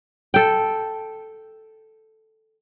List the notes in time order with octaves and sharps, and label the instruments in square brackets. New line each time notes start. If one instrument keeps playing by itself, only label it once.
[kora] A4 G5